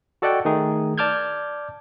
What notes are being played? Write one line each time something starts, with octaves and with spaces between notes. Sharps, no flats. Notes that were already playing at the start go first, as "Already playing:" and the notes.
F#4 A4 D5 D#5 F#5 G5
D#3 A3 D#4 G#4
D5 A5 D6 F6 G6 G#6